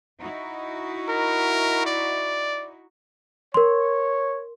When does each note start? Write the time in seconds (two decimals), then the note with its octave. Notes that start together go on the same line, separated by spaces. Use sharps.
0.20 D#4 E4 F#4
1.09 A#4
1.86 D5
3.54 A#4 C#5 C6